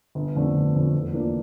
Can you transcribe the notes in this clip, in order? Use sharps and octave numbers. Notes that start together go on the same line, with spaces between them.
G1
F2 D3 A3 D4
G1
F2 D3 A3 D4
E2
E3 A#3 D4 F4